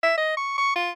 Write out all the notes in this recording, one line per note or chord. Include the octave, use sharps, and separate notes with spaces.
E5
D#5
C#6
C#6
F4